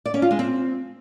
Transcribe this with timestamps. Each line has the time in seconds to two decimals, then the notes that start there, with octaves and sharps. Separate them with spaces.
0.06 D5
0.14 C#4
0.22 F4
0.31 G#3
0.39 C4